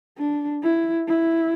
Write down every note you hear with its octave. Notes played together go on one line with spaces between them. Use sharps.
D4
E4
E4